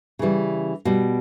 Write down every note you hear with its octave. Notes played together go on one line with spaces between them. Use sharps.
C#3 E3 G3
B2 G3